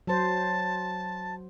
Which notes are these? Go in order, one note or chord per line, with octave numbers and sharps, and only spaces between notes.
F#3 C5 A5